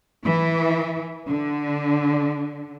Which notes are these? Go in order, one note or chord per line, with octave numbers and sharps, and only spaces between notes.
E3
D3